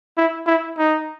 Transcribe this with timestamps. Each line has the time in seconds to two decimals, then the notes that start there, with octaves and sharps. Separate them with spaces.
0.18 E4
0.47 E4
0.78 D#4